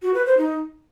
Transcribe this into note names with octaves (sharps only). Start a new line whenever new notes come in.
F#4
B4
C5
D#4